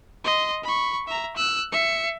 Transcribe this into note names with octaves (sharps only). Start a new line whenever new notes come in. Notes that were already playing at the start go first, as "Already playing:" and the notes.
D#5 C6
B5 C#6
E5 A#5
E6 F#6
E5 C#7